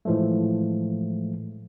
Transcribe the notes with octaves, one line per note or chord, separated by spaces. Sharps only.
A2 E3 F3 G#3 A3